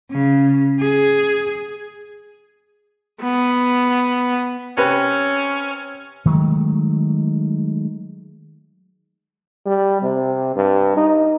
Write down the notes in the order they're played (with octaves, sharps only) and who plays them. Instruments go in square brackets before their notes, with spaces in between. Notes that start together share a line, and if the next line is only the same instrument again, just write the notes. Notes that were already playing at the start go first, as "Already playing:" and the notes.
[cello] C#3
G#4
[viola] B3
[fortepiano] C3 B4 [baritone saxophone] C#4
[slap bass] D#3 F#3 G#3 A3
[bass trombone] G3
C3
G2
D#4